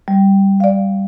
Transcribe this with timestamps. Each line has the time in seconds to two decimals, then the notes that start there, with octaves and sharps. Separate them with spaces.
0.08 G3
0.60 D5 F5